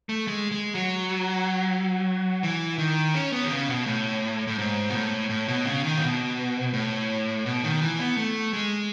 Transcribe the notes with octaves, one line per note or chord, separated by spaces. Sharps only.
A3
G#3
G#3
F#3
E3
D#3
C#4
B3
D#3
C#3
B2
A2
A2
G#2
B2
A2
A2
B2
C#3
D#3
A2
B2
A2
B2
D#3
E3
B3
A3
G#3